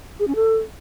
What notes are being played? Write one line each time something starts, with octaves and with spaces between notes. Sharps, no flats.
G#4
C#4
A4